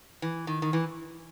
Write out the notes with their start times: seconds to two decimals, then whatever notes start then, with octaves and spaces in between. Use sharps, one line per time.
0.22 E3
0.47 D#3
0.62 D#3
0.73 E3